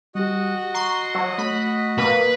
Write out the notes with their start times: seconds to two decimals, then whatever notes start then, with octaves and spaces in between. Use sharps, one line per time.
0.15 G3 F#4 G4 D#5 F#5
0.74 A#5 C6 C#6
1.15 F#3 E6
1.38 A3 B5
1.98 A#3 B4